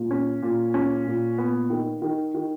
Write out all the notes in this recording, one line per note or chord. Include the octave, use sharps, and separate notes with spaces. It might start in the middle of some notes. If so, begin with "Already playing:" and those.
Already playing: A#2
C#4
A#2
C#4
A#2
B3
D#3
D#3
D#3